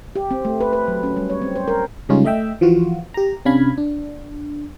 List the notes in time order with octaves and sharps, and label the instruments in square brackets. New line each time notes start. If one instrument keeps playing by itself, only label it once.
[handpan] G4
C4
A3
B4
B4
F#3
C#4
G3
C#5
C4
C5
A#4
[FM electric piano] C#3 G3 G#3 C#4 D#4 F4
A3 D#5 E5 G5 E6
E3 F3 F4 F#4
G4 A#5
C3 C#4 D4 F5 B5 G#6
D4